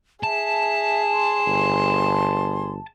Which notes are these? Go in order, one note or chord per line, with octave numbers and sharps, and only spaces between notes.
G#4 E5 A5
C6
G1